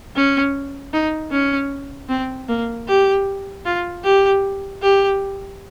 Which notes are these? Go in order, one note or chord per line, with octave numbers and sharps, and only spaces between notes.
C#4
D#4
C#4
C4
A#3
G4
F4
G4
G4